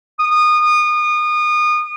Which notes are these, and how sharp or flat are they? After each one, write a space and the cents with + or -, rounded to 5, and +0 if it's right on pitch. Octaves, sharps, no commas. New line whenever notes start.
D#6 -30